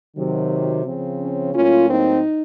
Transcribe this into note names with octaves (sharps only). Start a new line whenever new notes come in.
C3 D#3 F#3
C#3 F3 C4
C#4
A2 F#3 A#3 C#4 F4
C4 D#4